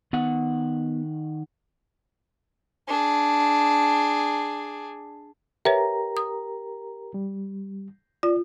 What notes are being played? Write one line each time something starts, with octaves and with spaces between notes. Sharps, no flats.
D#3 B3 F#5
D4 G#4
G4 A#4 B4 C#5 E5 A#5
D#6
G3
F4 D5